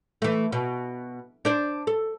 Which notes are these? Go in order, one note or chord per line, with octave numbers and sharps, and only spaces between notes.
E3 A3
B2
D4 C5 D5
A4